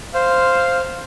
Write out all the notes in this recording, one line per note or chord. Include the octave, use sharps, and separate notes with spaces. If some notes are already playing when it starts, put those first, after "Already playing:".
C5 F5